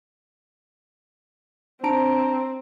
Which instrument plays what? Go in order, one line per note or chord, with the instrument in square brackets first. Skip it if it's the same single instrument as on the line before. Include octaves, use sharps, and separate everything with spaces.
[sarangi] C4 [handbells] D4 A#5 D7